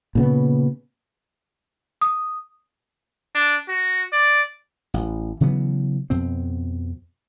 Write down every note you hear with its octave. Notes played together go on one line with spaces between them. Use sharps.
A#2 C#3 B3
D#6
D4
F#4
D5
A1
C#3 E3 F#3 B3
F2 B2 C4